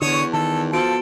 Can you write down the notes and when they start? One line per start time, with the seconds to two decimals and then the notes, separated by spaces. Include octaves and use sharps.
0.01 E2 D3 C#5 C#6 D#6
0.33 D#3 A4
0.73 F3 B3 F#4 A4 D7